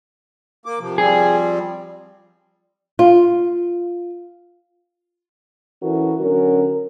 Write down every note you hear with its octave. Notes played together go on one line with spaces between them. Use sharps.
A#3 D6
C3 F3
F3 G3 C4 G#4
F4
E3 C#4 E4 F#4 A4 A#4
D3 F#3 C#4 A#4